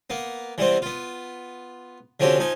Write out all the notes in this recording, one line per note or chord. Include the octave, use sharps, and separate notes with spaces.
A#3 B3
E3 G3 B3 C4
B3 F4
D3 F3 C4 C#4 F#4 G4
F3 D#4 G#5